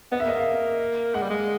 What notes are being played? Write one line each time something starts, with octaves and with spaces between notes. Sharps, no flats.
B3 D#5
A#3 E5
D#5
A#3 F5
G#3 F#5
G3
G#3